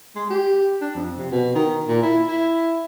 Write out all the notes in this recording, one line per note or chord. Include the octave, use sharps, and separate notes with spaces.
G#3
G4
D4
F2
C3
B2
D#3
A#2
E4
E4